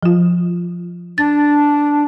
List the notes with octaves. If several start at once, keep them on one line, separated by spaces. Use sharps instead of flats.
F3 F4
D4 A6